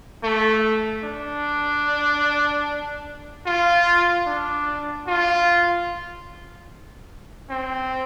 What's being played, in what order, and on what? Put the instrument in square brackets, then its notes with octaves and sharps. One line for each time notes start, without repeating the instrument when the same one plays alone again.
[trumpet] A3
D4
F4
D4
F4
C4